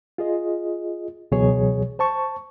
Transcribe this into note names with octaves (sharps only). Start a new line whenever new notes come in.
F4 G#4 D#5
C#2 B2 E3 F#3 G#4 C#5
C5 A5 C#6